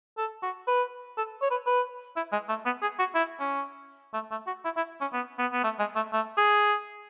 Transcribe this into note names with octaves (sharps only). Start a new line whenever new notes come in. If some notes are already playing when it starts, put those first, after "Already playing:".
A4
F#4
B4
A4
C#5
B4
B4
E4
G#3
A3
B3
G#4
F#4
E4
C#4
A3
A3
F#4
E4
E4
C#4
B3
B3
B3
A3
G#3
A3
A3
G#4